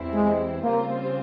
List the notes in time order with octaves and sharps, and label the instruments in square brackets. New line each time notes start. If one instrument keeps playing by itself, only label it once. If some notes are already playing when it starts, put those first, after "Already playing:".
Already playing: [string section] E2 E3 G3 C4 E4
[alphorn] G#3
[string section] C#3 G3 C4 F4 C5 [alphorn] A#3